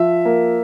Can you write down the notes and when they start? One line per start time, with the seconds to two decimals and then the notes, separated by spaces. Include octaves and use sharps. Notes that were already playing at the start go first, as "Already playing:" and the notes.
Already playing: F3 E5
0.25 A#3